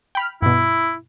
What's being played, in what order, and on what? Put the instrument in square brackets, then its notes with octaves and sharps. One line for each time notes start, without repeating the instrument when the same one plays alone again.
[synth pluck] G5 B5 F6
[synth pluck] G2 B2 [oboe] E4